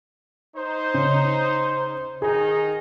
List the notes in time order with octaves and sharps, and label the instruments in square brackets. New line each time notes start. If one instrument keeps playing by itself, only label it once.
[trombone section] D#4 C5
[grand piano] C#3
[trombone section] D#3 D#4 [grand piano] G#4